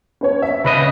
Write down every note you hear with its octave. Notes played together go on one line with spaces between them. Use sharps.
C#4 C5 C#5
E5
C#3 B4 D#5 B5